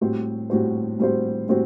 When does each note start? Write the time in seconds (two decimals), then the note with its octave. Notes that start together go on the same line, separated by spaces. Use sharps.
0.01 A2 G3 C4 F#4 C5
0.50 A2 G3 C4 F#4 C5
0.99 A2 G3 C4 F#4 C5
1.48 A2 G3 C4 F#4 C5